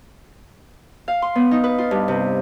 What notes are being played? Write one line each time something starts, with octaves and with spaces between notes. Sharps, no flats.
F5
C6
B3
D#4
B4
F4
G2
C3